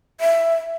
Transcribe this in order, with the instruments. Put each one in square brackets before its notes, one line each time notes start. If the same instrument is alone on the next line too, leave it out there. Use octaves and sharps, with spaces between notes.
[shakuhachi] E5